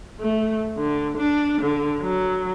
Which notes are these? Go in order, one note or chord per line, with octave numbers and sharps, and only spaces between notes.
A3
D3
D4
D3
F#3